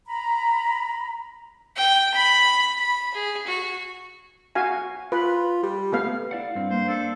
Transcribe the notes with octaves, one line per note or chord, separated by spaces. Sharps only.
A#5 B5
G5
B5
B5
G#4
F#4
F#4 F5 G#5
F4 B4
G3
A3 B3 F5
E4 D5 F5 F#5
G2 C4
A#3 C5
D4 A4